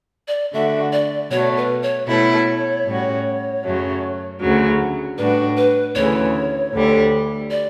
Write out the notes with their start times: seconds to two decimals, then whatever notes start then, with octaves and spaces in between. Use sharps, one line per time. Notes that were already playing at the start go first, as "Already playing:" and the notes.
0.28 D5
0.53 D3 A3 D4 F#4 E5
0.92 D5
1.31 B2 F#3 A3 C#5
1.57 B4
1.82 C#5
2.08 B2 A3 E4 C#5
2.86 A2 G3 C#4 F#4
3.64 F#2 C#3 F#3 A3
4.40 D2 C#3 F#3
5.18 A2 G3 D4 F#4 B4
5.57 B4
5.95 D2 C#3 E3 C#5
6.73 D2 D3 G3
7.50 D5